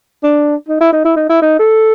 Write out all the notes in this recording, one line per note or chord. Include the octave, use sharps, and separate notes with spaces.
D4
D#4
E4
D#4
E4
D#4
E4
D#4
A4